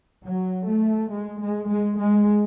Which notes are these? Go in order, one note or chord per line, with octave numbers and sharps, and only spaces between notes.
F#3
A3
G#3
G#3
G#3
G#3